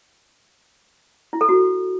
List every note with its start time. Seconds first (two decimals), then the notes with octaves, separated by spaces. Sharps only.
1.33 E4
1.41 A4
1.49 F#4